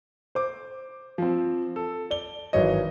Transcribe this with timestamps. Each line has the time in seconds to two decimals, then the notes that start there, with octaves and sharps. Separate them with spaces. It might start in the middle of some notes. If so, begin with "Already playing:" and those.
0.35 C5 D6
1.18 F3 C4
1.76 A4
2.11 D5 G7
2.53 G#1 E3 F#3 C#5 D#5